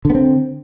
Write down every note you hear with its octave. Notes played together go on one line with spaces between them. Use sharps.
D3 B3 C4